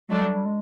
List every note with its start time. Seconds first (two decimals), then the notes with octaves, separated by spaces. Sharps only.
0.09 F#3 G#3 A3 D4
0.22 G3
0.34 G3
0.46 G#3